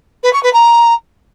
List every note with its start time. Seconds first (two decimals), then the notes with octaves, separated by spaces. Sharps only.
0.23 B4
0.33 C#6
0.43 B4
0.53 A#5